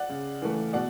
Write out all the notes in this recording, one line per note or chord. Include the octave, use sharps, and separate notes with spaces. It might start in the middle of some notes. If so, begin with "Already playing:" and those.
Already playing: D5 F#5
C#3
E3 A3
B2 D5 F#5